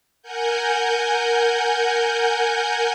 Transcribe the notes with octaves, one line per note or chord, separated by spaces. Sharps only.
A#4 F#5 G#5 G6